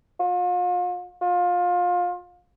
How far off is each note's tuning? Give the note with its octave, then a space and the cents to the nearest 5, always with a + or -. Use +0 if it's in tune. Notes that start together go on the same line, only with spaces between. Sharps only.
F4 +40
F4 +25